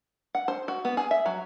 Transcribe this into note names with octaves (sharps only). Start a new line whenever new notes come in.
F#5
C5
F#4
B3
G#4
E5
F#3